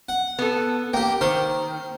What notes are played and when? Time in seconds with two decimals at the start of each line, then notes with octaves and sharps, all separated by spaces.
0.09 F#5
0.39 B3 A4
0.93 A#3 G4 G5
1.21 D#3 C5